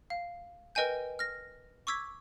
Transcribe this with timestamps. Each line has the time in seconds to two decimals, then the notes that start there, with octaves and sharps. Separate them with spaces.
0.10 F5
0.75 A#4 B4 D#5 G5 G#5 G6
1.19 F6 A#6
1.87 C#6 D6 E6 G#6 B6